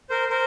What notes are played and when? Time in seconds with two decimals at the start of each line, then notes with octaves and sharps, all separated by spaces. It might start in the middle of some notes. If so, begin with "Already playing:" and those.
0.10 A#4 C5
0.30 A#4 C5